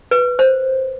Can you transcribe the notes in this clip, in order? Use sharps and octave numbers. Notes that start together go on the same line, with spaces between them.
B4
C5